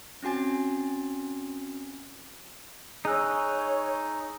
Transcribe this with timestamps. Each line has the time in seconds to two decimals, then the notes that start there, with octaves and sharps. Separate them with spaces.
0.23 C4 C#4 F#4 G#5 A6
3.05 D#4 G#4 C#5 G#5 E6 F#6